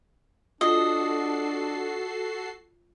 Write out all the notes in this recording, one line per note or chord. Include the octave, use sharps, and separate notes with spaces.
D4 F4 F#4 A4 D#5 C7